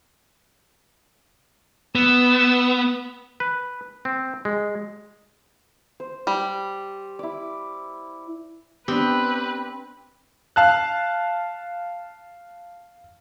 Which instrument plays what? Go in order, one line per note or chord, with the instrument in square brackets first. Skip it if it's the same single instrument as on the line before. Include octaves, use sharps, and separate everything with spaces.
[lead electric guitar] B3 [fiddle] E6
[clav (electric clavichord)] B4
C4
G#3
[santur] C5
[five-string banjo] G3
[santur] E4 D5
[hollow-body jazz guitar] B3 D4 [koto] C4 [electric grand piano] G4 [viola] B4
[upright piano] F5 A5 F#6